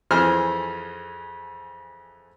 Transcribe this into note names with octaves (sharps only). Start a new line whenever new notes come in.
F2 E3 G#4 C5 F6